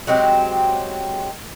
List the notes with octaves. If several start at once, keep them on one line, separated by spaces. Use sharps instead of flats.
F#3 G#3 C4 G4